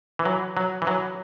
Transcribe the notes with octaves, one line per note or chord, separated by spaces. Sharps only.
E3
F#3
F#3
E3
F#3